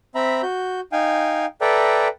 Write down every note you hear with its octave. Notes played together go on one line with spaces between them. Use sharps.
C4 E5 A#5 B5
F#4 G6
D#4 F5 G5 G#5
A4 B4 D5 E5 G5 A#5